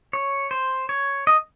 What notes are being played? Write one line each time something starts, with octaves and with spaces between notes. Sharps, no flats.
C#5
C5
C#5
D#5